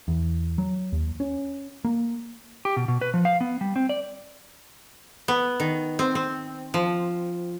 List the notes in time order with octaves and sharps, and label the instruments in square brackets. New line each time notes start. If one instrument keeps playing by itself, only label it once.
[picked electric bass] E2
F#3
D#2
C#4
A#3
[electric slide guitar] G4
B2
B2
B4
F3
F5
B3
G3
C4
D5
[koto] B3
D#3
C4
C4
F3